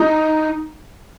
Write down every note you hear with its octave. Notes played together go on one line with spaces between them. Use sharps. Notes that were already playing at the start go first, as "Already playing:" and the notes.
Already playing: D#4